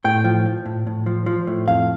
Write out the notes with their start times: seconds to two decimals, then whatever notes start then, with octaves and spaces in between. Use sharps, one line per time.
0.05 A2 G5
0.24 F3
0.46 F3
0.66 A2
0.87 A2
1.06 F3
1.26 F3
1.47 A2
1.68 F2 F5